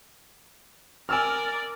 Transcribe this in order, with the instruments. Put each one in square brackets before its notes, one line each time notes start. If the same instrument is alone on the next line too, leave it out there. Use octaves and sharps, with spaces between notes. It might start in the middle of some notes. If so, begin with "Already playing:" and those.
[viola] A#4 D5 [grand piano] G#5 E6 F6